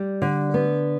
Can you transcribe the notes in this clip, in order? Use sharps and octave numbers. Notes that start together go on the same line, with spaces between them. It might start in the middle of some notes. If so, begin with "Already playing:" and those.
Already playing: G3 D5
D3
B3